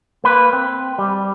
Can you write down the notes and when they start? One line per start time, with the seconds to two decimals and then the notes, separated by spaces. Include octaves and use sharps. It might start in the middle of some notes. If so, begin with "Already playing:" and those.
0.24 A#3 B4
0.53 C4
0.98 G3